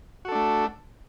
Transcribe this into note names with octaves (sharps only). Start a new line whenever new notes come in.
A3 D4 F#4 A4